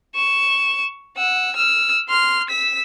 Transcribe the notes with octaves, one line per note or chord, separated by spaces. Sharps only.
C#6 E7
F#5 E6
E6 F6
C6 F6
E6 B6